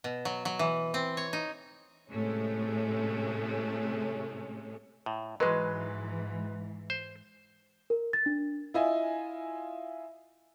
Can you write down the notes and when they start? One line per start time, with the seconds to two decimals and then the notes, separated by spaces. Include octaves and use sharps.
0.04 B2
0.25 F#3
0.45 F#3
0.59 E3
0.94 C4
1.17 C#5
1.33 D#4
2.10 A2 C3 G#3 A3 C#4
5.06 A2
5.40 G#2 E3 F#3 G#3 B4 D#5 C6
6.90 C5
7.90 A#4
8.13 A6
8.26 D4
8.74 E4 F4 D#5 E5 G#5